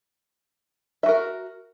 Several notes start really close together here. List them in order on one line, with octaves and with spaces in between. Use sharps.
E5 F#4 A#4